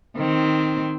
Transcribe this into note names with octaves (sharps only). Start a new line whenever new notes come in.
D#3 C4